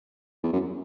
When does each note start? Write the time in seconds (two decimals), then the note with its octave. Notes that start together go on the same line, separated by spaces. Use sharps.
0.44 E2
0.53 F#2